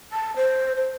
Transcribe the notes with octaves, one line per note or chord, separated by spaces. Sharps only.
A5
C5
C5